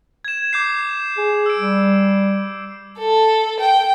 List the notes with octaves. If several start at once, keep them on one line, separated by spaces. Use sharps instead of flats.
G#6 E7
D6 G6 C7
G#4
E6 D7
G3
A4
G5